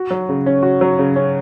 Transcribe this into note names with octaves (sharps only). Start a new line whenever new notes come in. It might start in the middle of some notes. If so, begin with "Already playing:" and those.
Already playing: F#4
F#3
C#3
C#4
F#4
F#3
C#3
C#4